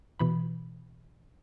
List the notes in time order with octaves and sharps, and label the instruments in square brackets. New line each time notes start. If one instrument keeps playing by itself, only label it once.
[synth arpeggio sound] B2 E3 B5